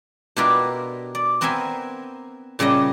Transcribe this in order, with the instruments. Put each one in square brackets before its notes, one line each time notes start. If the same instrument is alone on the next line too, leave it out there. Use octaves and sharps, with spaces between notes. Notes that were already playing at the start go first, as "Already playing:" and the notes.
[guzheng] B2 D4 E4 F4 G4 A#4
D5
B3 C4 A#4 C5 E5 G#5
A#2 C#3 G3 G4 D#5